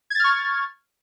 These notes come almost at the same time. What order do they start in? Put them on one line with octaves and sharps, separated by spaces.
G#6 A6 F6 C#6